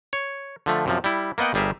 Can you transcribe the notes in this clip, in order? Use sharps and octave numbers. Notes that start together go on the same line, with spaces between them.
C#5
D3 F3 A3
F#2 C3 F3
G3 E4
A#3 B3 D#5 F#5 G5
G1 G3 G#4 A#4 E5